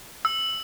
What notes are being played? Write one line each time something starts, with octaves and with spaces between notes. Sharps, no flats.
E6